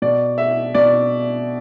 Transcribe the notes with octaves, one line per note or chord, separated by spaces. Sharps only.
B2 D5
E5
B2 D5